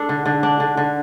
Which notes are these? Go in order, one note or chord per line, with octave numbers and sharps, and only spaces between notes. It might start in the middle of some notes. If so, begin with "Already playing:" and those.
Already playing: D4 A4
D3
D3
D4
D3
D3